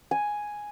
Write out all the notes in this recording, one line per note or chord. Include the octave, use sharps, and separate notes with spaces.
G#5